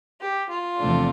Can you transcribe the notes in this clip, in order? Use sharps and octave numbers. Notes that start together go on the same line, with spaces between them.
G4
F4
E2 C3 F3 A3 D4